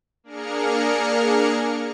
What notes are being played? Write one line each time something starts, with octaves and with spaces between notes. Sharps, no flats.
A#3 D4 G#4 A#4 F6 C#7